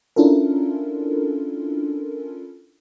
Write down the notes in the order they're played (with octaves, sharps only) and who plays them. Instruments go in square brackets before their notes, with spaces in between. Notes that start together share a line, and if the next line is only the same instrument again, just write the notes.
[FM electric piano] C#4 D4 E4 F4 A4 A#4